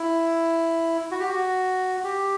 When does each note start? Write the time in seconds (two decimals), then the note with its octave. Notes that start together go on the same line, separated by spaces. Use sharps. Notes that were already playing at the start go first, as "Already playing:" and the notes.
Already playing: E4
1.11 F#4
1.20 G4
1.29 F#4
2.04 G4